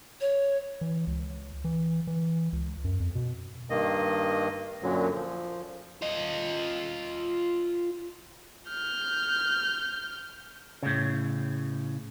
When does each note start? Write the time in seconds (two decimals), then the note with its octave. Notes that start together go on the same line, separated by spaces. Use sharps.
0.21 C#5
0.81 E3
1.07 C#2
1.64 E3
2.07 E3
2.53 C#2
2.84 F#2
3.00 F2
3.15 B2
3.70 G2 D#3 A#3 D#5
4.83 F#2 A#2 D3 F#3
5.14 F3
6.02 F4 D#5
8.69 F6 G6
10.83 A2 C#3